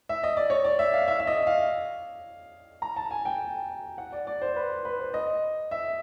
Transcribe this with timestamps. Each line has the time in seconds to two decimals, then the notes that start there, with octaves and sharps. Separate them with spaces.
0.09 E5
0.24 D#5
0.37 D5
0.50 C#5
0.64 D5
0.79 E5
0.94 F5
1.08 E5
1.19 E5
1.27 D#5
1.47 F5
2.82 A#5
2.96 A5
3.11 G#5
3.25 G5
3.98 F#5
4.12 D5
4.27 D5
4.42 C5
4.56 B4
4.85 B4
4.99 C5
5.14 D#5
5.71 E5